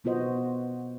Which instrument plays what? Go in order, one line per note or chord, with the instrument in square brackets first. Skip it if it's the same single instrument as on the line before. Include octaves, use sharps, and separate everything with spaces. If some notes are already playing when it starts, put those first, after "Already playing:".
[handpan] B2 B3 F4 F#4 C5 D#5